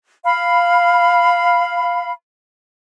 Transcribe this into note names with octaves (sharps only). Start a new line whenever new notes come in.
F5 B5